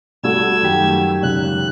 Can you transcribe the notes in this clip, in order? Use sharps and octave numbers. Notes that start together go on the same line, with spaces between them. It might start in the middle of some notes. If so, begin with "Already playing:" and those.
G3 A3 F#4 E6 G#6
F#2 D#3 G4
C#2 F#6